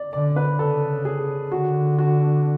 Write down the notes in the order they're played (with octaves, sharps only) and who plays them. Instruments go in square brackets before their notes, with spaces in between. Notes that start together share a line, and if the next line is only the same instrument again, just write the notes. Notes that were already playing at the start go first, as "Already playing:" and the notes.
Already playing: [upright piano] D5
[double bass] D3 [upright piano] D5
[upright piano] B4
[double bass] C#3 [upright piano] A4
[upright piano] G#4
[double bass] D3 [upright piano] F#4
[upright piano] F#4